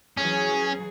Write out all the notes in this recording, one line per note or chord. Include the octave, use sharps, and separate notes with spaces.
E3 F#3 C#4 G#4